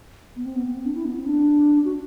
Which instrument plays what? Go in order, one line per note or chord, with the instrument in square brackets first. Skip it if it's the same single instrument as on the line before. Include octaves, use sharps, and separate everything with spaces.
[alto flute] B3
C4
B3
B3
C4
D4
E4
B3
C4
D4
F#4